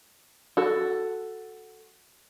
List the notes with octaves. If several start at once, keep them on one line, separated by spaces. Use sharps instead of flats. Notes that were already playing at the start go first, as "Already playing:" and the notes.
F#4 A4